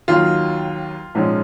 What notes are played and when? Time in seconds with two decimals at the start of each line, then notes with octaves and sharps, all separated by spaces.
0.08 D#2 D#3 F#3 F4
1.15 A#1 G#2 F3 G#3 C#4